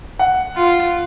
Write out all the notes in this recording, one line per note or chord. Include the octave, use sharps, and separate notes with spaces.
F#5
F4